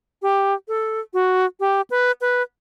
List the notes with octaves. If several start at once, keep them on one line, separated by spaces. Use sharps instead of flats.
G4
A4
F#4
G4
B4
B4